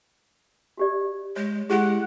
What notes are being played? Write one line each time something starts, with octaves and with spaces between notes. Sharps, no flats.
F#4 G4 D5
G#3 C#5
G#3 E4 G4 G#4 F#5